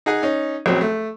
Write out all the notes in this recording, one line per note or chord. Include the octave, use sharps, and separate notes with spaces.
D#4 G#4 F#5 G#5
C#4 D#4
A#1 F#3 C4 C#4
A3